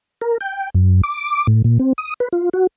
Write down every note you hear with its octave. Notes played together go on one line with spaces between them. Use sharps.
A#4
G5
F#2
D6
A2
A#2
C4
D#6
B4
F4
F#4